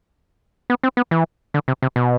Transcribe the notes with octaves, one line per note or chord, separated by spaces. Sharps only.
B3
C4
B3
E3
D3
C3
C3
B2